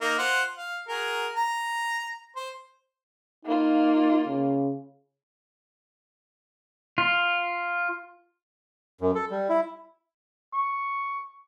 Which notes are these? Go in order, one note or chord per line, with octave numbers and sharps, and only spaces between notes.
A#3 D#4
F4 C5 F#5
F5
F#4 G#4 A#4
A#5
C5
A#3 D#4 F4
C#3
F4
F#2
A4
G3
E4
C#6